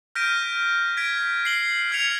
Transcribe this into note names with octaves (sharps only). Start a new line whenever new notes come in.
F6 G6 A#6 B6 D7 D#7
G#6 B6 D7
C7 F#7 G7
F6 G#6 B6 C#7 F7